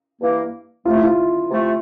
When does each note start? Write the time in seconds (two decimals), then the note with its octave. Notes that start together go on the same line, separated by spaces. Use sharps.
0.21 G2 E3 A#3
0.86 C3 F3 A3 F4
0.95 E4
1.04 F4
1.51 C3 F3 A3